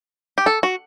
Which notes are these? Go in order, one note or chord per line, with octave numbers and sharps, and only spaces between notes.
G4
A4
F#4